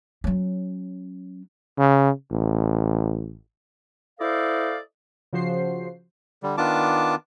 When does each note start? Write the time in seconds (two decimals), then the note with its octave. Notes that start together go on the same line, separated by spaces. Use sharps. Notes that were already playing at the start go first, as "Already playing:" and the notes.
0.24 F#3 C#4
1.78 C#3
2.31 A1
4.20 E4 A4 C5 D5 D#5 F5
5.33 C#3 F3 F#4 C5 C7
6.43 D3 G3
6.58 D#3 B3 D4 F4 A5 D6